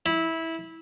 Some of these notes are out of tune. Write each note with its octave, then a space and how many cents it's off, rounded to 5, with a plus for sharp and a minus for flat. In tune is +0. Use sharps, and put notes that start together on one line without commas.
E4 -15